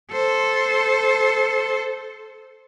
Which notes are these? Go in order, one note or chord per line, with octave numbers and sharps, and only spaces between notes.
A4 C5